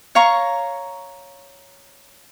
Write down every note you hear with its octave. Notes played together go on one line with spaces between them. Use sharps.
C#5 F5 A#5 C#6